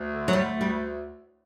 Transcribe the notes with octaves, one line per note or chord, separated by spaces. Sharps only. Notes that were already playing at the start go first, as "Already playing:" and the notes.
Already playing: D2
D3
F#3
G3 A3
D2
G3